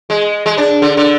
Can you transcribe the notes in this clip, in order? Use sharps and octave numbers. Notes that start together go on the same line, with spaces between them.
G#3
G#3
D4
D3
D3